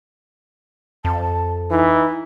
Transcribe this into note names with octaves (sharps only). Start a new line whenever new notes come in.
F2 A5
E3 D#4